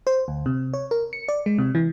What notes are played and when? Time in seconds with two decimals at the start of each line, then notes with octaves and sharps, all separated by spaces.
0.07 C5
0.28 D2
0.46 C3
0.73 C#5
0.91 A#4
1.13 C#7
1.28 D5
1.46 G#3
1.58 C3
1.75 E3